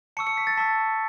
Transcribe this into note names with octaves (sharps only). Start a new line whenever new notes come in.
A5 C#6 E6 C#7
C#7
B6
A6
A5 C#6 E6 B6